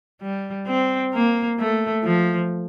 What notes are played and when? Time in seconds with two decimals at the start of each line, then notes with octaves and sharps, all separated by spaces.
0.22 G3
0.67 C4
1.14 A#3
1.59 A3
2.04 F3